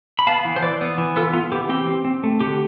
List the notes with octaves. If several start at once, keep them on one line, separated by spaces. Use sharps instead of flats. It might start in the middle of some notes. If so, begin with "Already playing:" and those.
B5
B3 F5 A5
E3
C5
E3 B4 D5
B3
E3
B3 F4 A4
B3 F4
E3 G4
C4 G4
C4
C4
A3
D3 G4